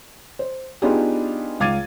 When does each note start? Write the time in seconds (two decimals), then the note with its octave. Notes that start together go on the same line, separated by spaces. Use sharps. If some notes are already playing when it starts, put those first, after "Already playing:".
0.39 C5
0.82 B3 D4 D#4 F4 G4 G#4
1.60 C#2 F5 D6 G#6 A6 D#7